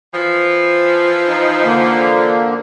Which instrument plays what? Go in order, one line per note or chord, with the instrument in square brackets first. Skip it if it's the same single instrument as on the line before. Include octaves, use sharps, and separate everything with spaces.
[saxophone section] E3 F3
[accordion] D#4
D3 A#3